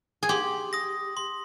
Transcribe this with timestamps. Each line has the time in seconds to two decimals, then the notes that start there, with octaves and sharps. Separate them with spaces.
0.23 G#4
0.29 G4 C6
0.73 D#6 A#6
1.17 C6